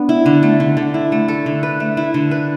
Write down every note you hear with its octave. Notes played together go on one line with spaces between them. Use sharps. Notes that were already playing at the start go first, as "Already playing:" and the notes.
Already playing: B3 D4
E4
D3
A3
D3
D3
E4
A3
A4
D3
B4
A3
E4
D3
B4